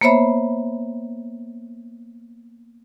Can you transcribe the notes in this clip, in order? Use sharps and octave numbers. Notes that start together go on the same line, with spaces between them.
A#3 B3 C5 C#5 E5 B5